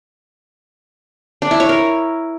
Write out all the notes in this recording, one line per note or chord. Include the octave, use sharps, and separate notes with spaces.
D4
E4
C#5
A#4